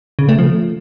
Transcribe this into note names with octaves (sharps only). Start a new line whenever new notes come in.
C#3
A3
F3